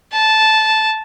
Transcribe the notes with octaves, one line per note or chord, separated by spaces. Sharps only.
A5